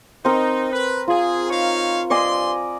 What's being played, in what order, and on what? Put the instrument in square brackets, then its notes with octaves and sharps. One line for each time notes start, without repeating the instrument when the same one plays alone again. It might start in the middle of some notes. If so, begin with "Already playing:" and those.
[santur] C4 A#4 [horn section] D#4
[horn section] B4
[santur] F4 [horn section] G#4
[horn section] D#4 C#5 F5
[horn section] G2 C6 [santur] D5 D#5 G#5